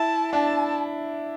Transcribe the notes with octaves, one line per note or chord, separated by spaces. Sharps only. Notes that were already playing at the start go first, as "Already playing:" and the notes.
Already playing: E4 A5
D4 A5